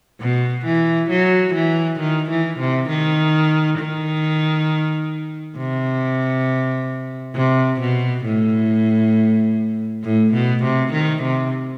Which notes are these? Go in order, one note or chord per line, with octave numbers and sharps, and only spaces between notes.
B2
E3
F#3
E3
D#3
E3
C3
D#3
D#3
C3
C3
B2
A2
A2
B2
C3
D#3
C3